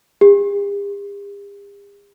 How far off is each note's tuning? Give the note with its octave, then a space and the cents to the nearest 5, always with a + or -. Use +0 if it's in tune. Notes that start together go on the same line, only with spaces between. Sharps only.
G4 +45